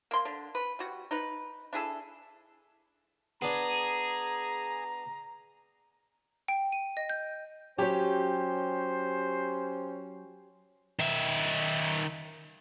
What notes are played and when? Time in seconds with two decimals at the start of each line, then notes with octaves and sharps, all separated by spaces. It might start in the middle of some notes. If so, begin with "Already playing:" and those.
0.11 A#3 C6
0.25 D3
0.55 B4
0.79 G3 F#4
1.11 D#4 B4
1.73 D4 E4 G#4 A4
3.42 B3 D4 G#4 A#5
6.48 G5
6.72 D#7
6.97 D#5
7.10 G6
7.78 F#3 C#4 G4 C5 C#5
11.00 D#3 E5